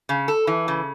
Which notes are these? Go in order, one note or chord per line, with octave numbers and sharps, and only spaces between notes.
C#3
A4
E3
C#3